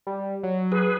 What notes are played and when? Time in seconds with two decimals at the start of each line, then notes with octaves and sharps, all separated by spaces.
0.07 G3
0.43 F#3
0.72 G#4 B4